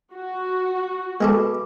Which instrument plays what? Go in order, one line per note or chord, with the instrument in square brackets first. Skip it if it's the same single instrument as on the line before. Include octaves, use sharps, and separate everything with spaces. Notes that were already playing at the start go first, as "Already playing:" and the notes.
[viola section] F#4
[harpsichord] G#3 G#4 A4 [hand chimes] B3 B4 D6